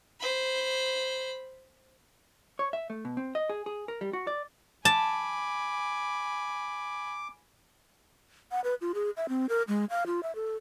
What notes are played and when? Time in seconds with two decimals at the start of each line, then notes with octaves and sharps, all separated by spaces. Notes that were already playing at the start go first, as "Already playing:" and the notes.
0.20 C5 B5
2.59 C#5
2.73 E5
2.90 A3
3.05 B2
3.17 C4
3.35 D#5
3.49 G#4
3.66 G#4
3.88 A#4
4.01 G3
4.13 F#4
4.27 D5
4.85 G#5 A5 B5 D6
8.51 F#5
8.64 B4
8.81 F4
8.94 G#4
9.17 E5
9.29 C4
9.49 A#4
9.68 G#3
9.90 F5
10.06 F4
10.23 E5
10.35 A4